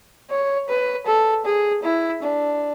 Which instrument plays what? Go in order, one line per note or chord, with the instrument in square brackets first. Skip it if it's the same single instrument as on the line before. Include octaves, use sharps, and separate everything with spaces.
[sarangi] C#5
B4
A4
G#4
E4
D4